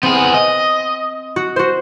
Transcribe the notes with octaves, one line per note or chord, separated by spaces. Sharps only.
B3 C4 G#4
D#5
F#4
F#4 C5